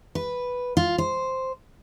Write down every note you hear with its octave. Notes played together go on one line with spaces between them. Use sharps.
B4
F4
C5